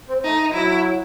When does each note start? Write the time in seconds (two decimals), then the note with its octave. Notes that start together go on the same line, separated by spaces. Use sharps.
0.09 C4
0.24 A3 D#4
0.53 F#3 E4